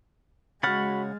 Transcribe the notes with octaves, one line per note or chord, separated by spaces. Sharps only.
C#3 G#3 F#4 C#5 F#5 B5 F6 A6